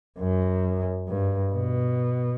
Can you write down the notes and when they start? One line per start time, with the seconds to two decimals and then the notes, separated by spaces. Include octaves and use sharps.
0.19 F#2
1.08 G2
1.53 B2